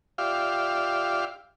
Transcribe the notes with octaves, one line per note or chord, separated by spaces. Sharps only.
F4 G4 D5 E5 F5